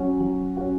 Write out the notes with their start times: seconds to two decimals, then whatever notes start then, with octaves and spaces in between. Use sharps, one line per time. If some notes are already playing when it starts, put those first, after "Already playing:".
Already playing: F#3 C#4 F#4
0.20 F#3
0.57 C#4 F#4